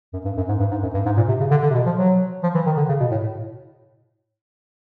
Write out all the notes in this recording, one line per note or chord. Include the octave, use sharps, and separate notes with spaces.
F#2
G2
F#2
G#2
G2
G#2
F#2
G2
G#2
A#2
C3
C#3
D3
D3
C3
B2
F3
F#3
F3
E3
D#3
D3
C#3
B2
A2